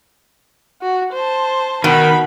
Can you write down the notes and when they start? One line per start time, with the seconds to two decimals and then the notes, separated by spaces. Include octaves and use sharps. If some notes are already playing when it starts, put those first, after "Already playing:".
0.82 F#4
1.13 C5 A5
1.84 B2 D#3 B5